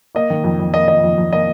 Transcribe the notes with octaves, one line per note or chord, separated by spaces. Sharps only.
A#3 D#5
D#3
F2
F2
A#3 D#5
D#3 D#5
F2
F2
A#3 D#5